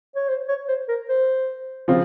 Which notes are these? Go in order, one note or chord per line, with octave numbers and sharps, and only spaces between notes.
C#5
C5
C#5
C5
A#4
C5
C#3 F3 C4 F4